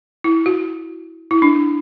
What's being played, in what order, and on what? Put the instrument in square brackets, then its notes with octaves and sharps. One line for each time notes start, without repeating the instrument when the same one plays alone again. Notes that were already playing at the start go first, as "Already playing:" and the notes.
[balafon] E4
F#4
E4
D4